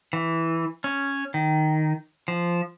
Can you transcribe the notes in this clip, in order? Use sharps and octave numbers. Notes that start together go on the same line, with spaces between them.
E3
C#4
D#3
F3